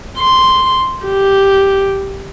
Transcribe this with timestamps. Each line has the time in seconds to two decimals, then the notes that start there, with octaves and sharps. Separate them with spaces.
0.18 C6
1.05 G4